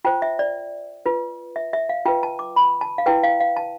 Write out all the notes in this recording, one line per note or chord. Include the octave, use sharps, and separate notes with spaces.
F4 C5 G5
E5
D5
F4 B4
E5
E5
F5
F4 B4 G5
A5
D6
B5
A5
F5
E4 B4 G5
F5
F5
A5